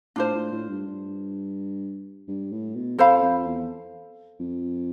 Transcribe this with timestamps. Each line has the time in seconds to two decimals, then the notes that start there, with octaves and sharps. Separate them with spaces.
0.16 A2 D4 F4 C5
0.34 A2
0.52 A2
0.69 G2
0.87 G2
2.28 G2
2.52 A2
2.75 B2
2.98 F2 A4 C5 F5 B5
3.22 F2
3.46 E2
4.39 F2